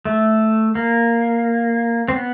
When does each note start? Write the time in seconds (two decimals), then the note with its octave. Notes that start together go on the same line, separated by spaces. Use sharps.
0.05 A3
0.75 A#3
2.08 C4
2.15 B3